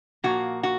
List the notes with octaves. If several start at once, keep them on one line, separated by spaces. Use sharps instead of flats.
A#2 F3 A#3 F#4
F#4